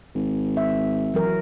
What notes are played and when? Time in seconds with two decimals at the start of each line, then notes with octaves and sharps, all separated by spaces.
0.15 G#1
0.57 E5
1.14 E3 F#3 A#4